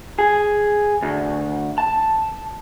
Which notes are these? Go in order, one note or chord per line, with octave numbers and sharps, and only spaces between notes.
G#4
D2
A5